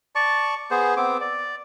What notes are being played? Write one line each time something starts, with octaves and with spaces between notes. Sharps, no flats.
D5 A5 C#6
B3 G#4 C5
B3 C4 D6
D5